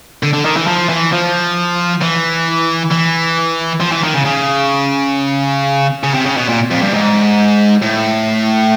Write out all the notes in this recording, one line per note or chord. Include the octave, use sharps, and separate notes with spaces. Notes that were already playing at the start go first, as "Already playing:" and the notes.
D3
D3
D#3
E3
F3
E3
F3
E3
E3
F3
E3
D#3
C#3
C#3
C#3
C3
C#3
B2
A#2
F2
G2
G#2
A2